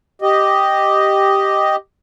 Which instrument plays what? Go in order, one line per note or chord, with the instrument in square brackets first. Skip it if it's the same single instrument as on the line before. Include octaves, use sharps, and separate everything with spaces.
[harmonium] G4 D#5